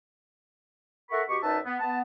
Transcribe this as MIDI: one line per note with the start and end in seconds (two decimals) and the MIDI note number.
1.11 1.22 64
1.11 1.22 69
1.11 1.22 70
1.11 1.22 78
1.11 1.22 83
1.11 1.22 85
1.29 1.37 47
1.29 1.37 66
1.29 1.37 67
1.29 1.37 85
1.42 1.57 42
1.42 1.57 63
1.42 1.57 71
1.42 1.57 74
1.42 1.57 76
1.42 1.57 81
1.65 1.77 59
1.80 2.00 59
1.80 2.00 81